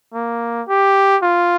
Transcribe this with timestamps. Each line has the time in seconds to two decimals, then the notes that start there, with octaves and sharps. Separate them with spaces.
0.14 A#3
0.68 G4
1.22 F4